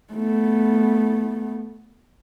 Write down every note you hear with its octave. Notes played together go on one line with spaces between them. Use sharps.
A3 B3